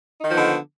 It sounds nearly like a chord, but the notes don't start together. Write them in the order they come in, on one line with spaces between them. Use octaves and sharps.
D#4 D#3 F3 B3 D3